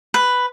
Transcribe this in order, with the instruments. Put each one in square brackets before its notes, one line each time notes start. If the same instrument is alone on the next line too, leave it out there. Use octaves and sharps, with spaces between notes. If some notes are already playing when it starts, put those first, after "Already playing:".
[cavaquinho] B4